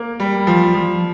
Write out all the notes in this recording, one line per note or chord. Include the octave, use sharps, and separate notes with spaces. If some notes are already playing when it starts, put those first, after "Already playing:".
Already playing: A#3
G3
F3
F3